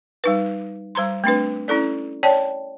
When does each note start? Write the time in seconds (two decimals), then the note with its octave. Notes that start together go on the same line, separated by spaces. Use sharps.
0.24 G3 D#4 B4
0.95 G3 C5 A#5 C6
1.24 A3 C4 D4 B4
1.68 C#4 E4 A4 D5
2.23 C#5 D5 G5 A5